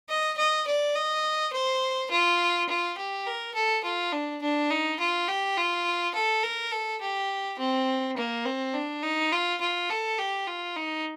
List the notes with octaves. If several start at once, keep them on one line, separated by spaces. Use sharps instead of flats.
D#5
D#5
D5
D#5
C5
F4
F4
G4
A#4
A4
F4
D4
D4
D#4
F4
G4
F4
A4
A#4
A4
G4
C4
A#3
C4
D4
D#4
F4
F4
A4
G4
F4
D#4